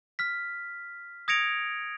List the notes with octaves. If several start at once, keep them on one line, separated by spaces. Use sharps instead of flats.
F6 B6
D#6 G#6 A#6 C#7 D7 F7